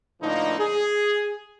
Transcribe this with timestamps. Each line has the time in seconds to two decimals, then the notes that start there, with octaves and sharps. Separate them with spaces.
0.22 A2 D3 F3 A#3 D4 D#4
0.60 G#4